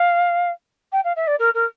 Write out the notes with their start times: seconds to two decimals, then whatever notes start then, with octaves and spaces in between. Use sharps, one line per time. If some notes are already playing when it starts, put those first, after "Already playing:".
Already playing: F5
0.92 G5
1.04 F5
1.16 E5
1.27 D5
1.39 A#4
1.54 A#4